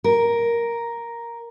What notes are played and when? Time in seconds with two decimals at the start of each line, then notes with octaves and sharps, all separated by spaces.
0.04 A#4